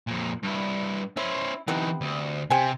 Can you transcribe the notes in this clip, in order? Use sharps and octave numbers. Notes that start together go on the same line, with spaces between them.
F2 A#2
G2 E4
C#4 E4 C5
C3 E3 B3 D#4
D2
C3 G4 C5 G#5